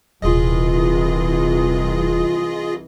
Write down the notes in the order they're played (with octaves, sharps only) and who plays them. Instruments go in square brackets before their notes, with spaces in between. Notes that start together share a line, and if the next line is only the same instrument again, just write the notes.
[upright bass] D#1 [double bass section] C2 E3 [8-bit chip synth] F4 G#4 D#5